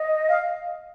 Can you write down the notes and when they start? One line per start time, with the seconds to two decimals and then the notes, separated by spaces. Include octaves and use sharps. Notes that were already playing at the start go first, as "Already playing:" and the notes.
Already playing: D#5
0.27 F5